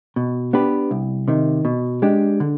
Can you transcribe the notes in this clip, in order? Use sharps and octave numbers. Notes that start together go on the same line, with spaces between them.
B2
B3 D4 G4 B4
C2
C3 D#3
B2
G#3 D4 G4
D3